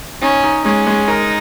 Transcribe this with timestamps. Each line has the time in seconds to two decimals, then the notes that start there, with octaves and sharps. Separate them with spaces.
0.22 C#4 D#4
0.43 D#4
0.65 G#3 C#4
0.87 G#3
1.08 D#4 A#4